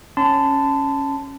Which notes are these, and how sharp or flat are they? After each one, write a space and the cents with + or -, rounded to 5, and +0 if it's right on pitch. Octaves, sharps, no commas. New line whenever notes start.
C#4 -10 A5 +0 C6 -40